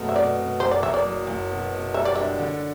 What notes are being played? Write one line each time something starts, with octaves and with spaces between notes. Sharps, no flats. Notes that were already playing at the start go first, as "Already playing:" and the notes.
Already playing: F#2 B2 A3
E5
B2 D5
B2
F#1 C5
D5
F#1 E5
D5
F#3
F#1
B2
B2
G3 E5
D5
D4 E5
D3